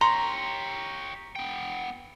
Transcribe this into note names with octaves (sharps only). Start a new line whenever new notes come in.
G4 C#5 A#5 C6
B3 G5